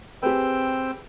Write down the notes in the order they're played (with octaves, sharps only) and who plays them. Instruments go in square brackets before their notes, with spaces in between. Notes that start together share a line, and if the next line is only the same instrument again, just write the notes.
[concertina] C4 G5 E6 [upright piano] G4 G#4 B4